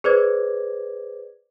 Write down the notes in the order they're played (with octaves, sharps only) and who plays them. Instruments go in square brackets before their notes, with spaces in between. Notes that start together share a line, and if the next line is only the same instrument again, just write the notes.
[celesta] G#4 B4 C5 D5 D6 G#6